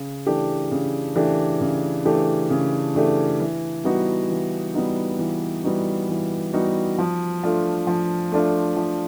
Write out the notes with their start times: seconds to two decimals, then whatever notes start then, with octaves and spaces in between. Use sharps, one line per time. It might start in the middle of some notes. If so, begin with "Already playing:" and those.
Already playing: C#3
0.27 E3 A3 D4 G4
0.72 C#3
1.16 E3 A3 D4 G4
1.61 C#3
2.05 E3 A3 D4 G4
2.50 C#3
2.95 E3 A3 D4 G4
3.40 E3
3.84 G3 B3 D#4 F#4
4.30 E3
4.74 G3 B3 D#4 F#4
5.19 E3
5.64 G3 B3 D#4 F#4
6.09 E3
6.53 G3 B3 D#4 F#4
6.98 F3
7.43 A3 D4 F4
7.87 F3
8.32 A3 D4 F4
8.77 F3